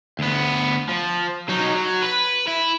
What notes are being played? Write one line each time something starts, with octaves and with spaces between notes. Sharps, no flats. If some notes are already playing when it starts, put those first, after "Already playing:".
D2 B3
F3
F#3 D#4
F#3
B4
E4